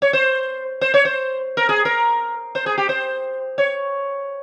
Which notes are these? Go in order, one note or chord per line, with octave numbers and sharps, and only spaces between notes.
C#5
C5
C5
C#5
C5
A#4
G#4
A#4
C5
G#4
G4
C5
C#5